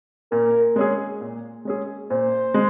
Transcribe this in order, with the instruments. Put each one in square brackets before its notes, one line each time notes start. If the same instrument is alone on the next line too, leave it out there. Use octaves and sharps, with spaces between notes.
[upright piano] A#2 [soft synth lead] A#4
[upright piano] G#3 C#4 G#4
A#2
G#3 C#4 G#4
[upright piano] A#2 [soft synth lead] C5
[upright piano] G#3